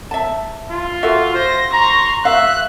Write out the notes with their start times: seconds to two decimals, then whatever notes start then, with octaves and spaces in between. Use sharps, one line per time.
0.11 E5 A5
0.70 F4
1.03 F#4 A4 E5 F5
1.35 C5 A#6
1.73 A#5 C6 C#6
2.25 E5 F5 F#6